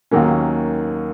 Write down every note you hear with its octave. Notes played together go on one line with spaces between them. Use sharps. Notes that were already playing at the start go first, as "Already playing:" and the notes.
D#2 D#3 F#3 A#3 C#4